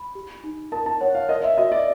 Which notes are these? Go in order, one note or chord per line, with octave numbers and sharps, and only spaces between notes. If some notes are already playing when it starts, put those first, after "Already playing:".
Already playing: B5
G4
D#4
A#4 A5
A5
C#5 F#5
F5
A#4 D#5
E5
F#4 D#5
D5